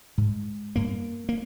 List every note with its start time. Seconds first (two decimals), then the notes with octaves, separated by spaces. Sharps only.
0.18 G#2 G#3
0.76 G2 A#3
1.29 A#3